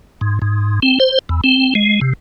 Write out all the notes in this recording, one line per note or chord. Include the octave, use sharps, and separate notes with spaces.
G#2
G#2
C4
C5
E2
C4
G#3
C3